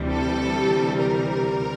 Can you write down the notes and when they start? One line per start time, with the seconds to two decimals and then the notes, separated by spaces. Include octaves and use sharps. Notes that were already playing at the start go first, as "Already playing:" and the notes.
Already playing: D2 C3 E3 G3
0.11 A4
1.00 A#4